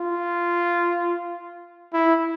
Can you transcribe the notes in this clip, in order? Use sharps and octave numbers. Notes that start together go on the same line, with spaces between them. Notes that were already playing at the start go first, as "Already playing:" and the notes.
Already playing: F4
E4